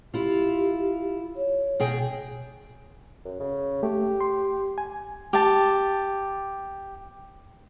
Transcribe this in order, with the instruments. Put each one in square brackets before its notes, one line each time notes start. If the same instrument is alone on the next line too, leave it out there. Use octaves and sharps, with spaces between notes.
[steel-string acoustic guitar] E4 F4 [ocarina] G4
[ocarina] C#5
[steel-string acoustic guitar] B2 G#4 G5
[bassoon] F#2
C#3
[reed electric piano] A3 [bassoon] G4
[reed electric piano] C6
G#5
[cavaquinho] G4 A5